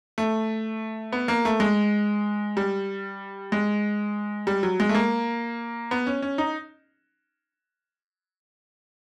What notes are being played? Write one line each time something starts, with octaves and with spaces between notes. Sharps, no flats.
A3
B3
A#3
A3
G#3
G3
G#3
G3
F#3
G#3
A3
A#3
B3
C#4
C#4
D#4